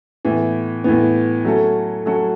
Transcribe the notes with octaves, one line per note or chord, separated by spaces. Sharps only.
A2 E3 B3
A2 E3 B3
F#3 A3 C#4 F#4 A4
F#3 A3 C#4 F#4 A4